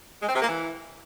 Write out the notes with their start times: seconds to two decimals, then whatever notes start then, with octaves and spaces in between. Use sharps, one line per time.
0.22 G#3
0.29 C4
0.35 C3
0.42 A#3
0.49 E3